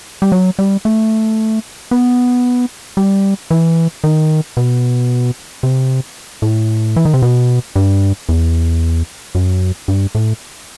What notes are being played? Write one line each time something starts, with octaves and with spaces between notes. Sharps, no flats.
G3
F#3
G3
A3
B3
G3
E3
D#3
B2
C3
A2
E3
D#3
C3
B2
G2
E2
F#2
G2
A2